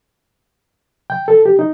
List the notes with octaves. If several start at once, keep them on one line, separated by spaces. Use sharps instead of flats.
G5
A4
G4
D#4